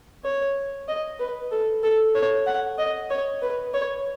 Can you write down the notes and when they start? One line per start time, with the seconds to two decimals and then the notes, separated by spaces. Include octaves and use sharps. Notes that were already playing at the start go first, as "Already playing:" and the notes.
0.25 C#5
0.88 D#5
1.19 B4
1.51 A4
1.83 A4
2.15 C#5
2.46 F#5
2.78 D#5
3.10 C#5
3.42 B4
3.74 C#5